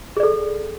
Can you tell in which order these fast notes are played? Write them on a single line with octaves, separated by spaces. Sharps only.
G#4 D5 A4